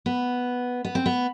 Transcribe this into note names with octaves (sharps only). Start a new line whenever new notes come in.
B3
B3
C4
B3